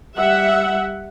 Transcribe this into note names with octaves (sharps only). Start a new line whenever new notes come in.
G3 E5 F#5